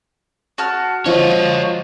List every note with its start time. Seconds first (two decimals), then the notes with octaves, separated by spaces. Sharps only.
0.58 F#4 A5 F6
1.06 F3 F4 C#5 D#5 C#6